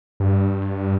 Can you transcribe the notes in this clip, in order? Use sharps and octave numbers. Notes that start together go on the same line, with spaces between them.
G2